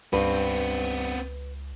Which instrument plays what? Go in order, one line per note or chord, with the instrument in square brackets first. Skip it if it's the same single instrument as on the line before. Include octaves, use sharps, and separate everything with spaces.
[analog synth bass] C#2 [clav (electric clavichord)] G2 [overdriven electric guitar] B3 C4 [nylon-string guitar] B4